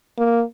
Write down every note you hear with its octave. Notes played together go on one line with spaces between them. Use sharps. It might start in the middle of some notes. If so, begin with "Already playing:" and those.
A#3